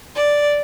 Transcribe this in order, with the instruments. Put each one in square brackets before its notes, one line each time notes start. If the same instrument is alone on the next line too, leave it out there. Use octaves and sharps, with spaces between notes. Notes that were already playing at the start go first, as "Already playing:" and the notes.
[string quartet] D5